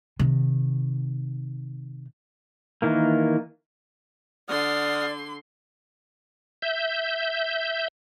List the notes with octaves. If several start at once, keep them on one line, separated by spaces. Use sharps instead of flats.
C3 D#3
D#3 E3 A#3
D3 D5 F#5 C6 D#6 F6
E5 G6